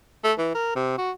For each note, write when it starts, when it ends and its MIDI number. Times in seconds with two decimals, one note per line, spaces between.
0.24 0.33 57
0.38 0.53 52
0.55 0.73 70
0.76 0.97 48
0.98 1.11 66